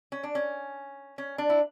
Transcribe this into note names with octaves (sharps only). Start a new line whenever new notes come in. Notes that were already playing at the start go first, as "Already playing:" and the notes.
C#4
D4
C#4
C#4
D4
E4